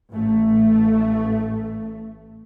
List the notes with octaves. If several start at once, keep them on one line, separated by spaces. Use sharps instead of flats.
A1 A3